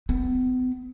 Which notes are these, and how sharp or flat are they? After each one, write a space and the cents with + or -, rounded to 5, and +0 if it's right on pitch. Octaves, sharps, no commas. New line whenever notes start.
B3 +40